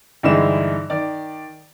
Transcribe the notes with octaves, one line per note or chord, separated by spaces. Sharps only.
G2 D3 E3 G#3 D#4 E7
D#3 D5